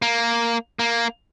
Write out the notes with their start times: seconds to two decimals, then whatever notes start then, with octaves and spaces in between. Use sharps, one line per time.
0.02 A#3
0.79 A#3